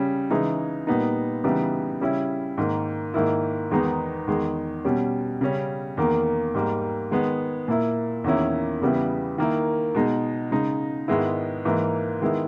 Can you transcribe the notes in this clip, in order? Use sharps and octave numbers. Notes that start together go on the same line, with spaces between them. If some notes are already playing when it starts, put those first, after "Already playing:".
Already playing: C#3 G3 C#4
C#3 E3 G#3 D#4
A#2 G3 B3 D#4
C#3 E3 G3 B3 D#4
C#3 G3 C#4 E4
G#2 D#3 A#3
G#2 D#3 A#3 E4
E2 D#3 G#3 B3 D#4
E2 D#3 G#3
B2 G3 C#4
C#3 G3 C#4
E2 D#3 A#3
G#2 G3 A#3
D#3 G#3 B3
A#2 A#3 E4
E2 D#3 A#3 C#4 E4
E2 C#3 G3 B3 E4
D#3 A#3 E4
B2 G#3 D#4
C#3 G#3 D#4
G#2 D#3 G#3 B3 E4
G#2 E3 A#3
D#3 G#3 B3 E4